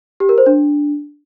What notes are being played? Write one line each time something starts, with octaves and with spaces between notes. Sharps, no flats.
G4
A#4
C5
D4